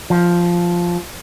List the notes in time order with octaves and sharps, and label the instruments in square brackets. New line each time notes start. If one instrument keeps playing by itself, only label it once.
[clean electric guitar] F3